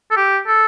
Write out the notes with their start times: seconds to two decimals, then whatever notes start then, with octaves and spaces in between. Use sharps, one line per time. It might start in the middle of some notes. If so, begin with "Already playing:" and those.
0.11 A4
0.17 G4
0.47 A4